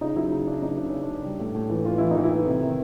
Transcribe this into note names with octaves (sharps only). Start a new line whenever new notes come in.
C#3 D#4
F#3 E4
C#3
C#3 D4
F#3 D#4
C#3 D4
C#3 C#4
D4
C#3
G3
A2
A2
E3
E3 F4
E3 E4
D#4
E3
E4
E3
C3
D#3